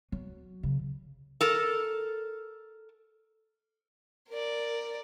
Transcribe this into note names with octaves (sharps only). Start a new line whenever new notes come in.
F#3
C#3
A4 A#4
A#4 D5